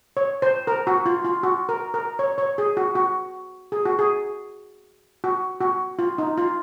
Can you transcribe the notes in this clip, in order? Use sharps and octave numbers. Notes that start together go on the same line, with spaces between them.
C#5
C5
A#4
F#4
F4
F4
F#4
A#4
A#4
C#5
C#5
G#4
F#4
F#4
G#4
F#4
G#4
F#4
F#4
F4
D#4
F4